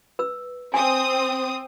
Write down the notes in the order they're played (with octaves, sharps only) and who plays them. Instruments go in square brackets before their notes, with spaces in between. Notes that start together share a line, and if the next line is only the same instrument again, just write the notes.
[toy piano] B4 E6
[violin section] C4 D#6 [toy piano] G#5